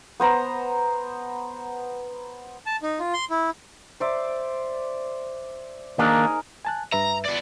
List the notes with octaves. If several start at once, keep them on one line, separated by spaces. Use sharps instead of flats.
B3 C5 A#5
A5
D#4
F4
C6
E4
C5 D5 E5
D#3 A#3 D4 D#4 G#4 A#4
G#5 A5 F#6
G2 B4 E5 A#5
B3 D5